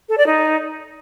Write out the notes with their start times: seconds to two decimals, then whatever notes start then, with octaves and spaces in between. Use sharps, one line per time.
0.09 A4
0.17 D5
0.26 D#4